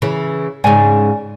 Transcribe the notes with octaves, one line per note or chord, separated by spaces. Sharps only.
C#3 E3
G#2 C#3 D5 G#5